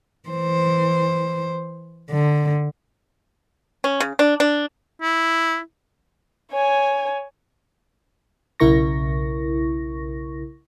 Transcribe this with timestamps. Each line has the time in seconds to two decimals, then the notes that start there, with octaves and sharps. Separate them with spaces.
0.29 E3 C5
2.10 D3
3.84 C#4
4.00 C#3
4.19 D4
4.40 D4
5.02 E4
6.52 C#5 G#5
8.60 B1 C#3 E4 A#4 C#6 A#6